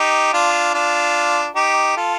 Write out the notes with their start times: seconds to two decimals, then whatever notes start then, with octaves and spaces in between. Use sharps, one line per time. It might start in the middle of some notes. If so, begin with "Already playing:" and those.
Already playing: D#4 G4
0.33 D4 F4
0.74 D4 F4
1.55 D#4 G4
1.97 F4 A4